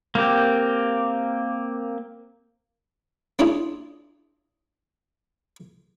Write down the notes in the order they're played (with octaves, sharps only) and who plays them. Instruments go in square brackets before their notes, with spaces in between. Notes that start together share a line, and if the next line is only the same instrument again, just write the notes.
[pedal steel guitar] A#3 C4 G4
[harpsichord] A#3 C#4 D4 E4 F4 G#4